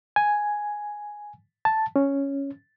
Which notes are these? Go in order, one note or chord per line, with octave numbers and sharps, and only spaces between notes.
G#5
A5
C#4